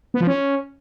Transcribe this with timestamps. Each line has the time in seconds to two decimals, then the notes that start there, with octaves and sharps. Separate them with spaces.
0.14 B3
0.21 F3
0.27 C#4